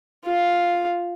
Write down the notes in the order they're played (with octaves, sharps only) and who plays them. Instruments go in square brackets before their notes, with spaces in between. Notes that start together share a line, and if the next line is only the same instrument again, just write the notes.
[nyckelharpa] F4 F5